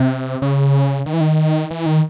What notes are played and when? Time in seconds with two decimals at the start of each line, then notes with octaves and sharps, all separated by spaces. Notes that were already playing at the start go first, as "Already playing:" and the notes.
Already playing: C3
0.42 C#3
1.06 D#3
1.13 E3
1.21 D#3
1.71 E3
1.86 D#3